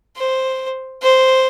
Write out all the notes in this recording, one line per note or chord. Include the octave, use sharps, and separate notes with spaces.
C5
C5